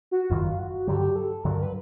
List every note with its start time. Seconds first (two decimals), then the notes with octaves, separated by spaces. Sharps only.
0.11 F#4
0.30 F#1 F#2 D#3 F4
0.59 F#4
0.87 G2 D3 F#3 G4
1.16 A4
1.44 G2 D3 F#3 A#4
1.62 B4